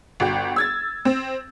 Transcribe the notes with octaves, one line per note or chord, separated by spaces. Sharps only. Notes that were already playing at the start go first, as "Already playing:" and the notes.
G1 F#4 G5
E6 G#6 A6
C4